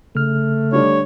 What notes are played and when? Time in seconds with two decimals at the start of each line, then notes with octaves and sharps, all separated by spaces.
0.15 C#3 A3 F6
0.73 D3 G3 D4 C#5